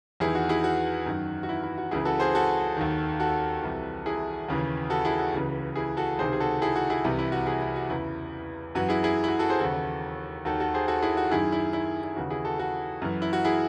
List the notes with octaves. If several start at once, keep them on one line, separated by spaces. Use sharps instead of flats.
E2 D#3 E4 G#4
F#4
E4 G#4
F#4
F#2 D#3
F#4
E4
E4
F#4
C#2 C#3 E3 E4 G#4
F#4 A4
G#4 C5
F#4 A4
D#2 D#3
F#4 A4
C2 C3 E3
E4 G#4
D#2 C#3 E3
F#4 A4
E4 G#4
F#4
C#2 C#3 E3 F#4
E4 G#4
F#4 A4
C#2 C3 D#3 G#4 C5
G#4
F#4 A4
E4 G#4
F#4
E4 G#4
C2 C3 E3
E4
F#4
E4 G#4
E4
F#4
E2 C#3 E3 E4
F#2 E3 F#4
E4 G#4
E4 G#4
E4
F#4
F#4 A4
G#4 C5
D#2 C#3 E3 F#4 A4
D#2 D#3 F#4 A4
F#4 A4
G#4 C5
F#4 A4
E4 G#4
F#4
F#2 D#3 E4 G#4
E4
E4
E4
D#2 C#3 E3 F#4
E4 G#4
F#4 A4
F#4 A4
F#2 E3
E4
F#4
E4 G#4